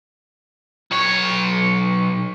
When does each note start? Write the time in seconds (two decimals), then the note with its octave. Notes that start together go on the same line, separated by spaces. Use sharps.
0.91 B1 C#5